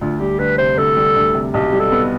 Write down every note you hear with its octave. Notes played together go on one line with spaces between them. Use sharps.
D2 F4
G3 G4
D2 B4
C3 C5
D2 A4
G3
D2
C3
B1 G4
G3
A4
B3